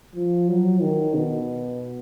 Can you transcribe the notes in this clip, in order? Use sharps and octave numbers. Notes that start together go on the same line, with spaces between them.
F3
F#3
D#3
B2